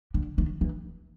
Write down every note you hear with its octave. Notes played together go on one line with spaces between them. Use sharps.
D3
D#3
E3